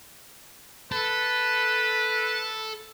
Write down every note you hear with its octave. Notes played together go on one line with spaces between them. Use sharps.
A4 B4